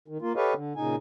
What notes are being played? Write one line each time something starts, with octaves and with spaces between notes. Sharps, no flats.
D#3
A#3 F4
G4 A4 B4 C#5 D#5 F5
D3
A#2 C#3 D#4 G#5